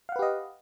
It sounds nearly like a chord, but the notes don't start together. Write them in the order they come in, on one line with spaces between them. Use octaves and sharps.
F5 F#5 B4 G4 D#5